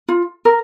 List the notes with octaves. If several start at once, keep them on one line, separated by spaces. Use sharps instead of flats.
F4
A#4